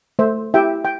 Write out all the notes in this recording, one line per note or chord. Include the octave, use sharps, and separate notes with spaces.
A3 C5 E5
E4 G4 E5 G5
G5